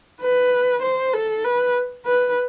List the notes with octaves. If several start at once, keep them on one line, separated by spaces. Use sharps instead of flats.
B4
C5
A4
B4
B4